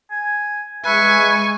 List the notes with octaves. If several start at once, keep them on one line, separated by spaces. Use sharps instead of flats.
G#5
G#3 B4 E5 G#5 C#6